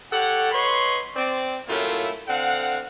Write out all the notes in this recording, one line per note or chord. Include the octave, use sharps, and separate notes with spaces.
G4 A4 C#5 F#5
B4 C#5 D#5 B5 C6
C4 D5
F#2 A2 A3 A#3 E4 F4
D3 C4 F5 F#5